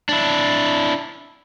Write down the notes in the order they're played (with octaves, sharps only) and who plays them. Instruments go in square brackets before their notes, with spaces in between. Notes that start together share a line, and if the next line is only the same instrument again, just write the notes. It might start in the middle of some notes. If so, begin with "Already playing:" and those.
[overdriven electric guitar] D4 E4